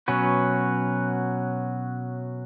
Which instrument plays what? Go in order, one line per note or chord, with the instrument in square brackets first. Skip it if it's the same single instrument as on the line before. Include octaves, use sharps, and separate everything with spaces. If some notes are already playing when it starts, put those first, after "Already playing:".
[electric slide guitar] B2 [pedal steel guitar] F#3 C#4 F#4 B4